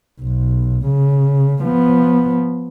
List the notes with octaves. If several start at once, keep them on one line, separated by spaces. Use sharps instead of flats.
B1
C#3
F3 B3